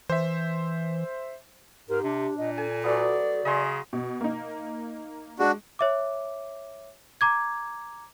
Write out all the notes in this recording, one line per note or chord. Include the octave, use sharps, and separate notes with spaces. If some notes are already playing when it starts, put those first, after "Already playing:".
E3 C5 E5
G#2 G4 A#4
C3 D4
A#2 D#5
A4 G#5
F#3 A3 B3 D5
C#3 D#5 G#5 C6
B2
A#3 D#4
G#3 D4 F#4
C#5 E5 D6
A#5 D6 G#6